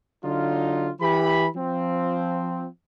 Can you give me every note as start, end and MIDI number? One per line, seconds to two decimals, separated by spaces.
0.24 0.89 50
0.24 0.89 54
0.24 0.89 63
0.24 0.89 65
1.01 1.46 52
1.01 1.46 67
1.01 1.46 83
1.57 2.66 53
1.57 2.66 60